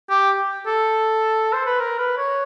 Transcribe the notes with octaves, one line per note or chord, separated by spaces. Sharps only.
G4
A4
C5
B4
A#4
B4
C#5